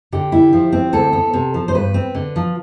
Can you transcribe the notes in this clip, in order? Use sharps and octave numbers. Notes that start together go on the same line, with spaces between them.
D3 G4
E4
F3
C4
D2 A4
B3
C3
F3
C5
G2 B4
C4
D3
F3